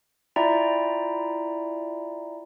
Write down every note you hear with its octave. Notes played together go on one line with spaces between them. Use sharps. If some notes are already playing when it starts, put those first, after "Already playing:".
E4 F4 D5 E5 G5 A#5